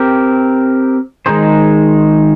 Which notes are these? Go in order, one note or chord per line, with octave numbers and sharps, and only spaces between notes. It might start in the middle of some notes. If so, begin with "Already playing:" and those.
Already playing: C4 G4 A#4
D#3 G#3 D#4 G#4 C5